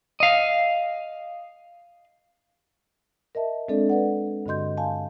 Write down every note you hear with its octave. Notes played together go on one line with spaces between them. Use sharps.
D#5 F5
A#4 D#5 E5 A5
G#3 C4 D4 A4 D5
B4 D5 F#5
G2 D3 F#4 D#5 C6 G6
F5 G#5 A5